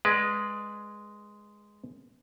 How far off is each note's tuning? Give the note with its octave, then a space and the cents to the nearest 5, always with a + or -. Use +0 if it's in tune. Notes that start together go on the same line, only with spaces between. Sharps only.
G#3 +0 B4 -15 D5 +20